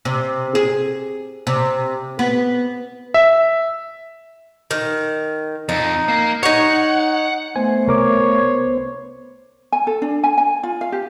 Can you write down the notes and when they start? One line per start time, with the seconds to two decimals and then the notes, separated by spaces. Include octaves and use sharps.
0.05 C3
0.55 G#4
1.47 C3
2.19 B3
3.14 E5
4.71 D#3
5.69 F2 D#4
6.08 A#3
6.43 D#4 C#5 F#5
7.56 A3 B3 C5 G#5
7.87 C2 A#4 C#5 D6
9.72 G#5
9.87 A4
10.02 D4
10.24 G#5
10.38 G#5
10.63 F4
10.81 F5
10.92 G4